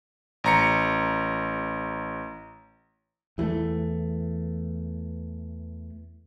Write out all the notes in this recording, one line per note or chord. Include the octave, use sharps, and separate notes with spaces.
A1 A#5 C#7
E2 E3 F#3 A3